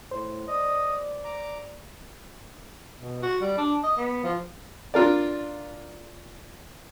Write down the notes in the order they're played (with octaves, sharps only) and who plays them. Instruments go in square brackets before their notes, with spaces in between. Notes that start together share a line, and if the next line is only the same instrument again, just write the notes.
[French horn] A2 [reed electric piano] C5
[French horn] D5 [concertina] D#5
[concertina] A#5 D6
[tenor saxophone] B2
F#4
G3
D4
D#5
B3
F3
[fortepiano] D4 F4 A#4 D5